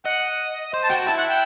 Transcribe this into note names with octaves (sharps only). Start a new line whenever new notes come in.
D#5 F#5
C5
A5
F#4 G5
E4 A5
F#5
G5